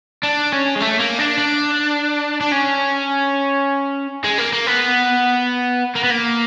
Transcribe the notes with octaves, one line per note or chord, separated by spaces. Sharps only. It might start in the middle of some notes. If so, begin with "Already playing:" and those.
D4
C#4
G#3
A3
A#3
D4
D4
D4
C#4
G#3
A#3
A#3
B3
A#3
B3
A#3